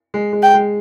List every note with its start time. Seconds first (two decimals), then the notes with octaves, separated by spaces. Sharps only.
0.14 G#3
0.33 G#3
0.43 G5
0.54 G#3